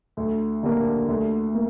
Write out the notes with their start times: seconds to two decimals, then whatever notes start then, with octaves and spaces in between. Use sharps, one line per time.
0.17 D2
0.63 D3 G3 A#3 D4
1.08 D2
1.55 A#3